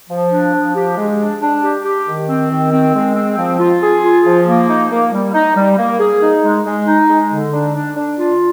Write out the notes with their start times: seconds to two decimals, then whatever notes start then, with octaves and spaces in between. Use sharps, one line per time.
0.10 F3
0.32 D4
0.54 F3
0.75 G4
0.97 G#3
1.19 D4
1.42 D4
1.63 G4
1.85 G4
2.07 D#3
2.28 C4
2.50 D#3
2.72 C4
2.94 G#3
3.16 C4
3.38 F3
3.59 F4
3.82 G#4
4.03 F4
4.25 F3
4.47 A#3
4.69 D#4
4.90 A#3
5.12 G3
5.34 D#4
5.56 G3
5.78 A#3
6.00 G#4
6.22 D#4
6.43 G#3
6.65 G#3
6.87 D#4
7.09 G#3
7.31 D3
7.52 D4
7.74 D4
7.96 D4
8.18 F4